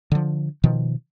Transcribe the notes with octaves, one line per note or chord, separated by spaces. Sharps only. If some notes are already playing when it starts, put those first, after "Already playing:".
D3 F3
B2 D#3 F3